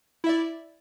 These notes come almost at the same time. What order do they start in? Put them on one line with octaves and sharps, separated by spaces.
E4 E5 D5